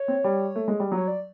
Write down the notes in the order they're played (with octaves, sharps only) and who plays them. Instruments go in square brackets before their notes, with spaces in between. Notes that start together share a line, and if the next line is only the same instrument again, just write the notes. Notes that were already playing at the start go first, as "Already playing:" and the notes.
Already playing: [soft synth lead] C#5
[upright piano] C4
G3
A3
G#3
G3
F#3
[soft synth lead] C#5
D5